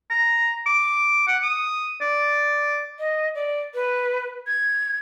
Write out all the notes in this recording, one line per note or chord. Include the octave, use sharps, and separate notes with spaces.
A#5
D6
F#5
D#6
D5
D#5
D5
B4
G#6